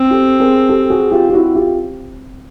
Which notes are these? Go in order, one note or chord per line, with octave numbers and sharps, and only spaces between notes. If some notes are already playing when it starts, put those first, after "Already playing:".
Already playing: C4
G4 A4
G#4 A#4
G4 A4
F#4 G#4
F4 G4
G4
E4 F#4
F4 G4